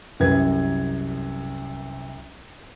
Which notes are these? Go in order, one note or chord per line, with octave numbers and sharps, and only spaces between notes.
C2 F#2 B4 G#6